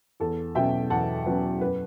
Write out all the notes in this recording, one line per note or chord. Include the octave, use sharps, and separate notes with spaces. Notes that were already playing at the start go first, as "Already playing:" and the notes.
E2 A4
B2 F#3 C#4 E5 G5
E2 F#5 A5
B2 F#3 C#4 B4
F#2 B4